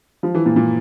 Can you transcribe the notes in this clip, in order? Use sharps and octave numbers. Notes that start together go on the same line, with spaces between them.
F3
E3
A#2
A#2